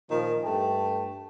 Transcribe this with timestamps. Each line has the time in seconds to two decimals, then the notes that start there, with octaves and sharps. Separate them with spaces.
0.11 A#2 D#3 F3 A#4
0.44 G2 A3 G5 A5